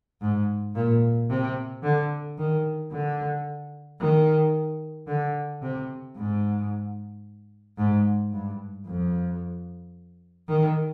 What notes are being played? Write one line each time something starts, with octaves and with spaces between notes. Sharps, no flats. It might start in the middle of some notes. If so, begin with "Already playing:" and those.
G#2
A#2
C3
D3
D#3
D3
D#3
D3
C3
G#2
G#2
G2
F2
D#3